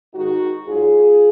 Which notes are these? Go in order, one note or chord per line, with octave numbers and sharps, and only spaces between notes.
G#2 D#3 G#3 D#4 F#4
G#2 F#3 F4 G#4